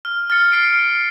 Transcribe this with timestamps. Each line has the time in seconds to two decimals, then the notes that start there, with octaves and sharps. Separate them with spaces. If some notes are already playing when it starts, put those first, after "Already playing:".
0.05 F6
0.30 F6 A6 C#7 G7
0.52 F6 C7 D7